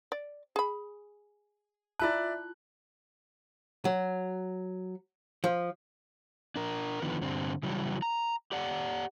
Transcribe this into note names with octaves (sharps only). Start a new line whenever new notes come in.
D5
G#4 B5
E4 F4 D5 E5 A5 F#6
F#3
F3
D4 A#4
D3 D#3 F3 B3
G2 D3 C4
C#3 E3 F#3 G3
A#5
G4 D5 F#5